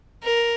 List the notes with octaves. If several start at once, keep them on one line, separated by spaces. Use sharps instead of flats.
A#4